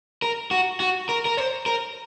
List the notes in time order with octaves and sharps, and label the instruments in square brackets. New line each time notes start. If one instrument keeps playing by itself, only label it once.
[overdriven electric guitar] A#4
F#4
F#4
A#4
A#4
C5
A#4